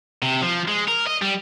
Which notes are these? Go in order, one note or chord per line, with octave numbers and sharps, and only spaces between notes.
C3
F3
G#3
A#4
D#5
G3